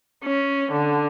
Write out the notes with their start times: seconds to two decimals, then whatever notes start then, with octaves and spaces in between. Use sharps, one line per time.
0.24 C#4
0.71 D3